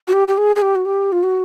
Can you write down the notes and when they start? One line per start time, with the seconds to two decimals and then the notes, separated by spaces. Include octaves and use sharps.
0.08 F#4
0.13 G4
0.28 G4
0.38 G#4
0.56 G#4
0.62 G4
0.75 F#4
0.85 G4
1.12 F4
1.23 F#4